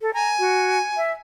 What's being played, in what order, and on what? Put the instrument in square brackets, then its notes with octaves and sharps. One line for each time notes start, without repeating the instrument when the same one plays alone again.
[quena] A4
[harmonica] G#5 [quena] A#5
[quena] F#4
E5